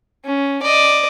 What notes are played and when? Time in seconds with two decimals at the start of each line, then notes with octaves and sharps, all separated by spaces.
0.25 C#4
0.62 D5 D#5